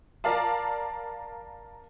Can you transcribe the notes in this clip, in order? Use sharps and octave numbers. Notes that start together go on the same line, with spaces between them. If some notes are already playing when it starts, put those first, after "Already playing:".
A#4 D5 F5 A5